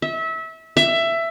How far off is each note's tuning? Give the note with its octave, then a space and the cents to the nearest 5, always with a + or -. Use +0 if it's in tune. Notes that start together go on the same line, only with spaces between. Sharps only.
E5 -25
E5 +15